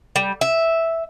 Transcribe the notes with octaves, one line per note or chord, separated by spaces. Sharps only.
G3
E5